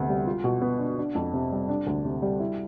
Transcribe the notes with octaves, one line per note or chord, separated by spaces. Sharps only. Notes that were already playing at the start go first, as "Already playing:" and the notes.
Already playing: D2 C3 B3
G3
F4
B2
B3
D4
D4
F2
C3
G3
D4
D2
C3
G3
E4